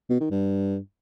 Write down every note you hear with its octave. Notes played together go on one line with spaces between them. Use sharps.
B2
D#3
G2